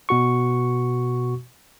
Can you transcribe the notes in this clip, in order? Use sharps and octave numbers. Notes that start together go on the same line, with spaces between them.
B2 F#4 C#6